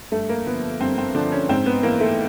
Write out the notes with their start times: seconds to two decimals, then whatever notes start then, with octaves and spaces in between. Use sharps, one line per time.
0.12 G2 A3
0.29 A#3
0.46 D3 F3 B3
0.80 G2 C4
0.98 C4
1.15 D3 F3 D4
1.32 C#4
1.49 G#2 C4
1.66 B3
1.83 E3 A#3
2.00 A3